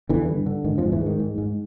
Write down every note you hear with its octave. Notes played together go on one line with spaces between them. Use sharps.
E2 D3 E3
G2
D3
G#2 D#3
F2 F3
G#2
E2 E3
G#2 D#3
G#2
G#2